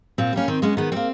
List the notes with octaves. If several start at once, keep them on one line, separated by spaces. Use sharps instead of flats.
A#2 C4
G3 A#3 C#4
D#3 C4
G#3 B3 C#4
D#3 B3
G3 A#3 C4